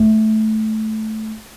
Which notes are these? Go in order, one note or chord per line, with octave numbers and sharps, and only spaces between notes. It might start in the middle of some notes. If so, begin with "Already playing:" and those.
Already playing: A3